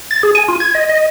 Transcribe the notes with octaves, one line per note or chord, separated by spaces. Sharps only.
A6
G#4
G#5
F4
G#6
D#5
D#5